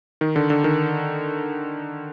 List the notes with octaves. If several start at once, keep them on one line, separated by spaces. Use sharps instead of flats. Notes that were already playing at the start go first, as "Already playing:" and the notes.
D#3
D3
D3
D#3